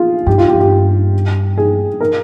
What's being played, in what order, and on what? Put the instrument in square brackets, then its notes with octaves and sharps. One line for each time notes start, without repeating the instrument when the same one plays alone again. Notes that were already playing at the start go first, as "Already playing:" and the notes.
Already playing: [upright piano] F4 G#4
[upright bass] G2 [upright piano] G4
[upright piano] F4
G4
G4
G#4
A#4